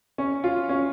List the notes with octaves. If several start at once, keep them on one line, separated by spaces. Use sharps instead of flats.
C#4
F4
C#4